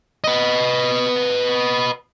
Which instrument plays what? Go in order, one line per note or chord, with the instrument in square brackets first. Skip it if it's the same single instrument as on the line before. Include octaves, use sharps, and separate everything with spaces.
[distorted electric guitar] B4 D#5